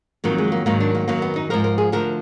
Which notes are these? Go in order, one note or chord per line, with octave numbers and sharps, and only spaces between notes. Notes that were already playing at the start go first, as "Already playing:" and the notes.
F2 D#3 F#3 A#3
G#3
A#3
G#2 D#3 F#3 A#3
D4
A#3
F#2 D#3 F#3 A#3
B3
D#4
G#2 F3 A#4
A#4
G#4
D2 D3 F3 A#4